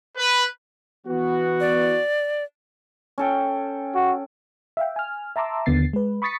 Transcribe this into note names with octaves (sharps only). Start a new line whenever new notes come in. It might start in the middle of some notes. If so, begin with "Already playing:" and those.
B4
E3 B3 F#4
D5
C#4 A4 G5
F#4
E5 F5 G5
G#5 F6
E5 A5 A#5 C6 D6 E6
D#2 D3 B3 A6 C7
G#3 B4
B5 C#6 D#6 A6 B6 C#7